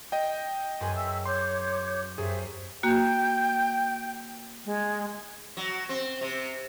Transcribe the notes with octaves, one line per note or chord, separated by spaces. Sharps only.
D#5 G5
F#2 G#4 B4 G#5 C6
E5 E6
C#5 C6 D6 G6
F#2 G4 G#4 C5 E5
A#3 F#4 G5
G#3
F#3
C4
C3